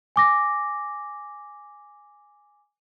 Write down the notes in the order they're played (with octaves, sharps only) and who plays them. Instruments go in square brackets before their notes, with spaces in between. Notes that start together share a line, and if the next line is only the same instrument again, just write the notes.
[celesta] G#5 D6 A#6